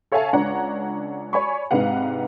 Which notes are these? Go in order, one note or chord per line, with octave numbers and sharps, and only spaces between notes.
A4 C#5 E5 F5 G#5 A5
C#2 D4 C#5 D5 F#5 A#5
C#5 D5 G#5 B5 C#6
G#2 C3 D4 B4 F5 F#5